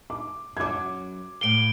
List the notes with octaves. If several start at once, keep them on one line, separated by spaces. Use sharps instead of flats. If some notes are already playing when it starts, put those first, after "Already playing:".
D6
F#2 F#3 D6 G#6
A2 F5 D7 G7